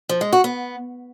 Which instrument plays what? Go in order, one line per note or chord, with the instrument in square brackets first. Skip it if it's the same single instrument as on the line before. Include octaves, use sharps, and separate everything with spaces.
[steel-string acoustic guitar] F3
G#3
F#4
B3